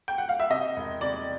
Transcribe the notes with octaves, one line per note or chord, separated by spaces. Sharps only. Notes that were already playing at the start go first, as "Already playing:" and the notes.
G5
F#5
F5
E5
C3 D#5
E1
C3 D5